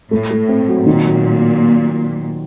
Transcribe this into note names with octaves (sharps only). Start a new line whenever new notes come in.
A2 A3
A3
C4
F#3
A#2 D#3
F#3